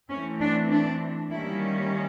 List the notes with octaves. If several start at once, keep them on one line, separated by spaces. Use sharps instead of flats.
E3 A3 C4 C#4
D4
D4
D#3 G3 A#3 C#4 E4